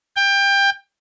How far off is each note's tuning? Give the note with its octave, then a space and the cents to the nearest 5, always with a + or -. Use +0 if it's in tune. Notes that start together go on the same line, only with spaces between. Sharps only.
G5 +20